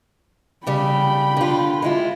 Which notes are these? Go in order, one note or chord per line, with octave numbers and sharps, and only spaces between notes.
C#3 G3 G5 B5
D3 F4
G#3 E4 F4